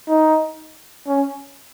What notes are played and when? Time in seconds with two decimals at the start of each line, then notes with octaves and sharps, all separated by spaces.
0.08 D#4
1.07 C#4